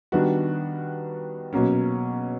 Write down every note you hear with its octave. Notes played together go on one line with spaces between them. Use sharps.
D#3 G3 B3 D4 F#4
B2 F#3 A#3 C#4